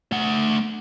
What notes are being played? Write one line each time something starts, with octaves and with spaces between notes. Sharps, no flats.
A3 F#5